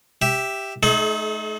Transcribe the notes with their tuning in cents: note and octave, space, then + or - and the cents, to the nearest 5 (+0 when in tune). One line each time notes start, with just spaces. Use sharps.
G4 +0 E5 +0
A3 -35 D#4 +0 G#4 +45